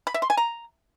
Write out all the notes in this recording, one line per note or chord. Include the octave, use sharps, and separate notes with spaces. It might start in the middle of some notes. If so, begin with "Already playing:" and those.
B5
E5
C6
G#5
A#5